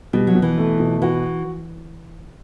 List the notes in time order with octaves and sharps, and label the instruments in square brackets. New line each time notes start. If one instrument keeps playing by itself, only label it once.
[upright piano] B2 [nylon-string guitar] G3
[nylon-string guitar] F#3
[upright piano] B2
[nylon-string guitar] E3
[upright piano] A3
B2
[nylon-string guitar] E3 [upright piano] F#4